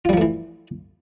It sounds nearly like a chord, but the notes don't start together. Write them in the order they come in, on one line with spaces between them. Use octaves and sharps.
F4 G3 F3 A3 E3